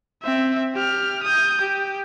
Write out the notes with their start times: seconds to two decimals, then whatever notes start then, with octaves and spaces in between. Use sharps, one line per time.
0.23 C4 E5
0.75 G4 F6
1.23 D#6 G6
1.61 G4